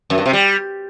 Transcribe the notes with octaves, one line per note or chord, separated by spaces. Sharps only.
F#2
G2
C3
G3